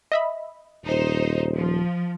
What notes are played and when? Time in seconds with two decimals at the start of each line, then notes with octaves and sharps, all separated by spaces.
0.12 D#5 E5 B5
0.85 D#1 D#4 C5
1.55 F3